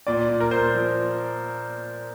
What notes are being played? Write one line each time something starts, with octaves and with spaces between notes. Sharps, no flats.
A#2 D5
A#2
A#4
A#2 C5
F3